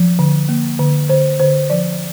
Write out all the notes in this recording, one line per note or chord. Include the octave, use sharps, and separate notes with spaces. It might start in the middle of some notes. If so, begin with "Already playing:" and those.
Already playing: F3
D3
A#3
D3
D3 C5
D3 C5
F3 D5